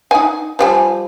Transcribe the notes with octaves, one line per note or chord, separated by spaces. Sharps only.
D#4 G#5
F3 G3 G#5